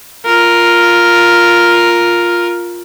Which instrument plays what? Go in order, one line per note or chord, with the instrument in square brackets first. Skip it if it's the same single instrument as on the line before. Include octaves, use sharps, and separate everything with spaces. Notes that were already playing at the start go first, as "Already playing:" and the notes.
[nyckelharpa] F4 A#4